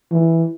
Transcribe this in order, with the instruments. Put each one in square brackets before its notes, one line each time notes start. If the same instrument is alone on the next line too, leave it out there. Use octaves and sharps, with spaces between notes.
[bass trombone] E3